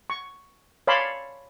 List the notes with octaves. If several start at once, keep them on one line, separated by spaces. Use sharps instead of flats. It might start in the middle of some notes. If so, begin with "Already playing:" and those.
C#6
C#5 D5 F5 A5 B5 C6